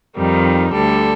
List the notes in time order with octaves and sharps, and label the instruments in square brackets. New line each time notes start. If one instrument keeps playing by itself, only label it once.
[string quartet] F2 D#3 G3 D#4
D2 D3 G3 A4